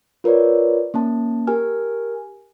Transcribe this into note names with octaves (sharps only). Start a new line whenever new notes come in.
F4 A#4 B4 C#5 D5
A#3 C#4 A5
G4 A#4 G#5 F6